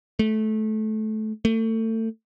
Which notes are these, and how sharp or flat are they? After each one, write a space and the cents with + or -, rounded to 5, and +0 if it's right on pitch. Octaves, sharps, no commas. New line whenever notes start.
A3 -20
A3 +30